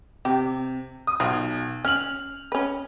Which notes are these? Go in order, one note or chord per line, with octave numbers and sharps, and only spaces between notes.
C3 G4
D#6
B1 F4
C#4 F6 F#7
C#4 B4